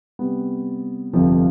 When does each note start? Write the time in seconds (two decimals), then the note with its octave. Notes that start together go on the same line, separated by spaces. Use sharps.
0.19 C3 G3 B3
1.13 G1 F2 C3 F3